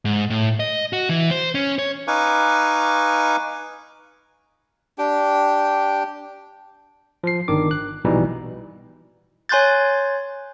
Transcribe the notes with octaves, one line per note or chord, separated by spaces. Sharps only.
G#2
A2
D#5
F#4
E3
C5
C#4
C#5
D#4 B4 F5 G#5 C#6 D6
D4 G4 G5
F3 C7
G1 D#3 D4 D6
F#6
A#1 B2 E3 G3 D#4
C#5 G#5 C6 F#6 G6 A6